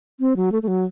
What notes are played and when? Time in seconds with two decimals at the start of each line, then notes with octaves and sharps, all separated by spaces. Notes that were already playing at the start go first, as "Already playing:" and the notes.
0.20 C4
0.36 F#3
0.52 A3
0.63 A3
0.68 F#3